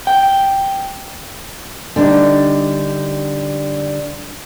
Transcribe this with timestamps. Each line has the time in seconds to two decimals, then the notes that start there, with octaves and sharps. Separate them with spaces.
0.07 G5
1.96 D3 G3 D4 D#4